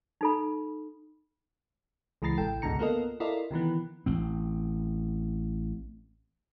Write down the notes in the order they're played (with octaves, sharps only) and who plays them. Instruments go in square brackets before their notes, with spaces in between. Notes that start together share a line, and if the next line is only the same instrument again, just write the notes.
[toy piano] D#4 A4 B5
[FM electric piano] C#2 E3 G#3 A#5 A6 C7
A1 C3 A4 G5
C#2 G#2 B2 D3 A#5 C#7
A#3 B3 F4 A4 A#4 D#5
E4 F4 A4 A#4 D5 D#5
C3 D#3 E3 B3
[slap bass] A1 C4